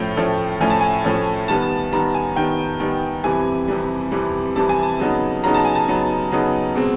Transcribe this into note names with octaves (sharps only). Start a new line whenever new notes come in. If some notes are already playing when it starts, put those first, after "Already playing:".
Already playing: A2 F3 A3 C#4 G5
A2 F3 A3 C#4
A2 F3 A3 C#4 G#5
A5
G#5
A2 F3 A3 C#4
D#3 G3 B3 A5
D#3 G3 B3 A#5
G#5
D#3 G3 B3 G5
D#3 G3 B3
F2 C3 E3 G3 G#5
F2 C3 E3 G3
F2 C3 E3 G3
F2 C3 E3 G3 A5
G#5
A5
C#3 F#3 B3 D#4
C#3 F#3 B3 D#4 A#5
A5
G#5
A5
C#3 F#3 B3 D#4
C#3 F#3 B3 D#4
B2 G#3 C4